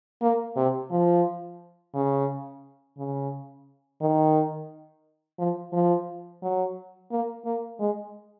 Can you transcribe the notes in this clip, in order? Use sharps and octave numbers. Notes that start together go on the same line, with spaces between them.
A#3
C3
F3
C#3
C#3
D#3
F3
F3
F#3
A#3
A#3
G#3